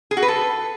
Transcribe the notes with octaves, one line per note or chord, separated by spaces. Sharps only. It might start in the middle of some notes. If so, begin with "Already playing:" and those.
G#4
F#4
B4
A4